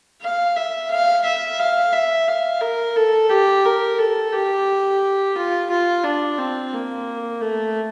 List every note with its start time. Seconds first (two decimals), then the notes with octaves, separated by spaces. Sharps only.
0.22 F5
0.56 E5
0.90 F5
1.24 E5
1.59 F5
1.93 E5
2.28 F5
2.61 A#4
2.96 A4
3.29 G4
3.65 A#4
3.98 A4
4.33 G4
5.36 F4
5.70 F4
6.03 D4
6.38 C4
6.73 A#3
7.41 A3